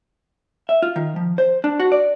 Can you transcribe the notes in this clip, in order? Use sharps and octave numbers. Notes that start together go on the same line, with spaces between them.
E5
F4
D#3
F3
C5
D4
F#4
D5